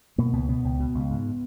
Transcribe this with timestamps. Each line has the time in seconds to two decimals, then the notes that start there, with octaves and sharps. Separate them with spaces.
0.18 B2 A#3
0.33 C#2 B3
0.49 B2 B3
0.64 C#2
0.80 B2
0.95 C#2
1.11 G#2